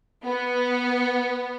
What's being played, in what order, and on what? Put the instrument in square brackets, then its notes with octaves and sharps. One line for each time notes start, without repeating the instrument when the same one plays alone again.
[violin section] B3